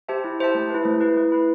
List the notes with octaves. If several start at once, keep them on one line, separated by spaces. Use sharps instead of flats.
G4 C5 E5 A5
E4
G4 C5 E5 A5
A3
E4 B4
A3
E4 B4
A3
E4 B4